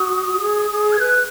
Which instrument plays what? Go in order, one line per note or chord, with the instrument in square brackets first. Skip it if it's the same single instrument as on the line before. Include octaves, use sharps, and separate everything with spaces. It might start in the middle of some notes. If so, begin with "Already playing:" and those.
Already playing: [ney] F#4 [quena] D#6
[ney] F#4
G#4
G#4
[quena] G#6
[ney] B4 [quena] F#6